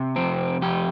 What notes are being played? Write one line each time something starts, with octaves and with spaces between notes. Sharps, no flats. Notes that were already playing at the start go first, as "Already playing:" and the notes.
Already playing: C3
F2 C4
F2 G4